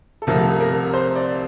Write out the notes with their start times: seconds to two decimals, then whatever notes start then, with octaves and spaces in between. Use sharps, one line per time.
0.22 A4
0.27 C2 C3 F3 A3 A#4
0.60 A#4
0.94 C5
1.15 D5